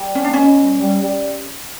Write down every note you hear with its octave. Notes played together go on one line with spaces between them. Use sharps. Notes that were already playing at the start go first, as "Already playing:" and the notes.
Already playing: G3
A#3 C#4
D4
B2 C#4
G3
G3
G3